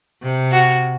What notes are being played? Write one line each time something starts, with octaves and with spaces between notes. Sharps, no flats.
C3
F#4